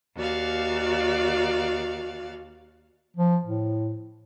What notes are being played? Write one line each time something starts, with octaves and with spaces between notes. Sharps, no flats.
D#2 F#4 D5 F5
F3
A2